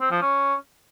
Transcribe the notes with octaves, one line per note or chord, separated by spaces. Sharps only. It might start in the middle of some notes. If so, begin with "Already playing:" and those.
C4
F3
C#4